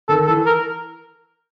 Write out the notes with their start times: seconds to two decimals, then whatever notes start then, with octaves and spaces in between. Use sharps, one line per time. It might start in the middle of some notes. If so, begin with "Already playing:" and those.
0.09 D#3 A4
0.27 E3 A4
0.46 A#4